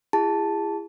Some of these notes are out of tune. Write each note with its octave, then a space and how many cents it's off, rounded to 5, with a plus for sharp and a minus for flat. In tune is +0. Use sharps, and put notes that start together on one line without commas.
E4 +35 G#4 -35 A5 +0